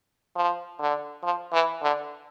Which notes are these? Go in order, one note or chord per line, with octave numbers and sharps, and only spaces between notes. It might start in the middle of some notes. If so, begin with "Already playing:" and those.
F3
D3
F3
E3
D3